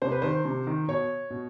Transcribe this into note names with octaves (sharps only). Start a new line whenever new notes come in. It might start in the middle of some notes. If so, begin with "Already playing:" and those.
C3 C5
B4
D#3 C5
C3
D#3
B2 C#5
B2